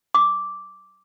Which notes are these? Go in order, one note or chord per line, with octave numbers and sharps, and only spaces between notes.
D6